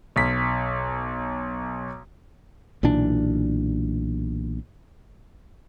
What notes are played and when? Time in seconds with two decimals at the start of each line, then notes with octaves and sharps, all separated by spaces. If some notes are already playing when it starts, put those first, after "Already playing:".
0.16 B1 B6
2.83 B1 A#2 E3 D4